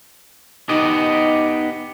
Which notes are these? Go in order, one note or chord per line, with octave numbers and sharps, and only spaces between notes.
B3 D#4 G4 D#5